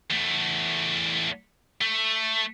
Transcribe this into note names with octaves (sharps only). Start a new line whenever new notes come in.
E2 A3
A3